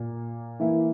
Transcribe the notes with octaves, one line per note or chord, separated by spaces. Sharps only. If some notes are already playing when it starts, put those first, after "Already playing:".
Already playing: A#2 A#3
E3 A#3 E4